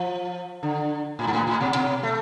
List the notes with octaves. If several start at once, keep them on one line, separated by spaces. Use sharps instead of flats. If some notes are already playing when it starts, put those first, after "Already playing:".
Already playing: F3
D3
A2
G#2
A2
A2
B2
B2
A3